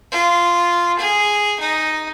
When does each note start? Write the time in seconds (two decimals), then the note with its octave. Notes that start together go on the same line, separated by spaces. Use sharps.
0.12 F4
0.98 G#4
1.60 D#4